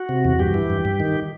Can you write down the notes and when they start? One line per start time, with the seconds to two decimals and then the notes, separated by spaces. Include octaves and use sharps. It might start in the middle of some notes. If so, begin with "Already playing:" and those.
Already playing: F#4
0.09 C3
0.25 E2
0.39 G2 G4
0.54 E3
0.70 G2
0.85 G2
1.00 D#3